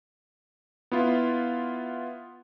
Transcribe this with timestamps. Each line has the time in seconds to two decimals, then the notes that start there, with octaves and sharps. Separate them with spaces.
0.92 B3 E4 F4